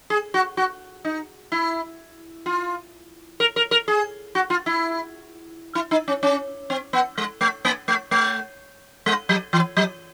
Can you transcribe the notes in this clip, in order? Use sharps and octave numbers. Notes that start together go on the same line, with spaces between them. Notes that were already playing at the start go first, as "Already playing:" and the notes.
G#4
F#4
F#4
D#4
E4
F4
A#4
A#4
A#4
G#4
F#4
F4
E4
E4
D#4
C#4
C#4
C4
B3
G#3
A3
A#3
A3
A3
G#3
F#3
E3
F#3